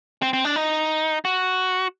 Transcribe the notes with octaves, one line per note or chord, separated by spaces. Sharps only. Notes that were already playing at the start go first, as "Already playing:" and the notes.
C4
C4
D4
D#4
F#4